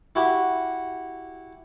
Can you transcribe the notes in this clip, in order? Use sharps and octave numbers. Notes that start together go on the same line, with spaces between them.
E4 F#4 G4